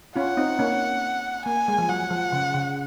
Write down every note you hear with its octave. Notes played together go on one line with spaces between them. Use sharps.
C#4 F4 F#5
C4 D#4
A#3 C#4
A#3 G#5
G#3
F3
F#3 F#5
F3
C#3
C#3